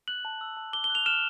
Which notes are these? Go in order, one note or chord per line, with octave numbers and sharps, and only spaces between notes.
F#6 F#7
A5
E6
A5
D6 G7
G7
F#6
F7
F6 E7